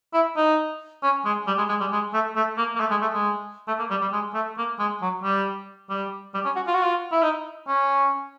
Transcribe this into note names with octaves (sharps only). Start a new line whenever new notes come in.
E4
D#4
C#4
G#3
G3
G#3
G#3
G3
G#3
A3
A3
A#3
A#3
A3
G#3
A3
G#3
A3
A#3
G3
G3
G#3
A3
A#3
G#3
F#3
G3
G3
G3
C#4
F#4
F4
F#4
F4
E4
D#4
C#4